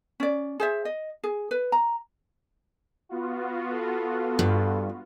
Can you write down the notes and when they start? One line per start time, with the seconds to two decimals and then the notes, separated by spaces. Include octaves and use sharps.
0.20 C#4 D5
0.60 G#4 C5 E5
0.85 D#5
1.24 G#4
1.51 B4
1.72 A#5
3.09 B3 F4 F#4
3.73 A4
4.39 G2